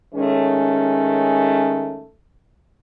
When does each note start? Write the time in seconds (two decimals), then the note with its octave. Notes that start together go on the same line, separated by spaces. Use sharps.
0.14 D#3 G#3 A3 C#4